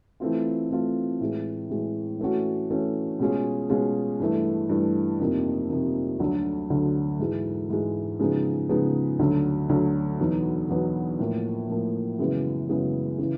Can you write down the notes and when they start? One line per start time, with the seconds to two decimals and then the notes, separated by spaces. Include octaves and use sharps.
0.20 E3 A3 C4 F4
0.71 E3 A3 C4 F4
1.20 A2 E3 G#3
1.70 A2 E3 G#3
2.19 E3 A3 C#4 F#4
2.71 E3 A3 C#4 F#4
3.19 B2 G#3 C#4 F4 G#4
3.70 B2 G#3 C#4 F4 G#4
4.19 G2 E3 A3
4.69 G2 E3 A3
5.19 F2 C3 F3 A#3 D#4
5.70 F2 C3 F3 A#3 D#4
6.20 D2 D3 F#3
6.70 D2 D3 F#3
7.19 G#2 E3 G#3
7.70 G#2 E3 G#3
8.19 C#3 F3 G#3 B3 D#4
8.69 C#3 F3 G#3 B3 D#4
9.19 D2 D3 F#3
9.69 D2 D3 F#3
10.19 E2 B2 F#3 B3 D#4
10.69 E2 B2 F#3 B3 D#4
11.19 A2 F3 A#3
11.69 A2 F3 A#3
12.19 F#2 C#3 E3 G#3 B3
12.69 F#2 C#3 E3 G#3 B3
13.18 C#3 E3